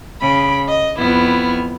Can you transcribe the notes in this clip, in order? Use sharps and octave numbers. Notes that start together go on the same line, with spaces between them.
C#3 B5
D#5
F2 B3 E4 F6